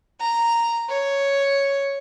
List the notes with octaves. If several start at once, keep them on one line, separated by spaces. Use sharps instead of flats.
A#5
C#5